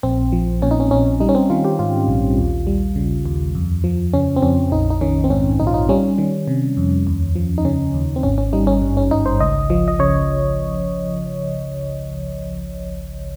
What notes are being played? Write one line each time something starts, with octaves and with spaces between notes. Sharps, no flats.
A#1 C4
F3
A#2 C#4
D#4
C#4
A#1 C#4
G3 D#4
C#4
C4
D#3 F4
G4
G#2 F4
A#1
D#2
G3
C#3
D#2
F2
F3
C#3 C#4
C4
F2 C#4
A#1 D#4
D#4
D#3 C#4
C4
G#2 C#4
A#1 D#4
F4
D#4
G3 C#4
D#3
C3
F2
D#2
F3
D#4
C#3 C#4
D#2
C4
G#1 C#4
C#4
G3 D#4
C#4
G2
C#4
G#1 D#4
C5
C#2 D#5
F3
D#5
C#3 C#5